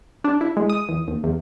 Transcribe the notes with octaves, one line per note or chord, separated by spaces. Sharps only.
D4
E4
G#3
D#6
E2
D#2
E2